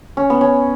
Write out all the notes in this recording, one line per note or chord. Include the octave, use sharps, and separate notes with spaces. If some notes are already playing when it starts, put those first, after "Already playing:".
C#4
B3
C#4